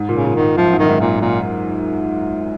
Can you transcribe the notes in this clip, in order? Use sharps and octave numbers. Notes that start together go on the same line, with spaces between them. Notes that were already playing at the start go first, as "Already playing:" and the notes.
Already playing: G#2
A#2
C#3
A#2
G#2 D#3
F#2 F3
G#2
F#2 D#3
G#2
A#2
A#2